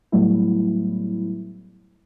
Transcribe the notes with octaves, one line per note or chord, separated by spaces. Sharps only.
A2 F#3 G3 A3 B3 E4